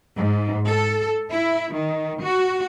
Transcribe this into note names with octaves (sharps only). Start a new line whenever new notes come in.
G#2
A4
E4
D#3
F#4